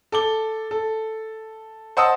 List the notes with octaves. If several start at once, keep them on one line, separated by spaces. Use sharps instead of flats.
A4 D6 G7
A4
C5 D#5 F#5 A5 D#6 E6